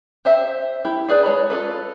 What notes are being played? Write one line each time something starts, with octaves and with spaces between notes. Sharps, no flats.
G4 C5 E5
E4 G4
D4 G#4 B4 D5
G#3 C#5 D#5 B5
F4 F#4 A4 B4